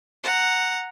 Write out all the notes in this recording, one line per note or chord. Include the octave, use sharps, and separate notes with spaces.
F#5 A#5